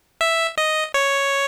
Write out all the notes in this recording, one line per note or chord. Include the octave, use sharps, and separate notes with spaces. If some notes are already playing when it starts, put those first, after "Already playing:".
E5
D#5
C#5